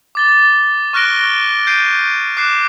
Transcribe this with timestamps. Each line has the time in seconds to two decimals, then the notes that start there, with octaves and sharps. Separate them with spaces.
0.15 D6 A6 G7
0.93 C#6 F6 F#6 A#6 D7 G7
1.67 G6 C7 D7 D#7
2.37 D6 F#6 C7 E7